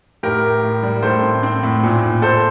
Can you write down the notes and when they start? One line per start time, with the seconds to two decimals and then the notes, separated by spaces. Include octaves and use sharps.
0.23 A2 G4 A#4
0.43 A2
0.63 A2
0.83 G3
1.02 A2 A4 C5
1.22 C4
1.43 C4
1.63 A2
1.83 A#2
2.03 A#2
2.22 A#2 A4 C5